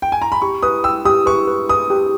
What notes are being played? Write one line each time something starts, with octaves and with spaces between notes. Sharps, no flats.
G5
G#5
A#5
B5
G4 C#6
B4 D#6
G5 E6
G4 D#6
B4 C#6
B4
B4 D#6
G4